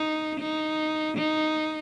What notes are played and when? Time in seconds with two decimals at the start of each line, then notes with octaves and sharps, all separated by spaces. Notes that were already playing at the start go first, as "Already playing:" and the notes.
Already playing: D#4
0.40 D#4
1.18 D#4